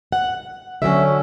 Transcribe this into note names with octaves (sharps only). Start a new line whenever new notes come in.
F#5
D3 F#3 C#4 E5